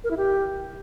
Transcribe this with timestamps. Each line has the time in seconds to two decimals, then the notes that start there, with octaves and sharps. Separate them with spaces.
0.04 A#4
0.11 E4
0.17 G4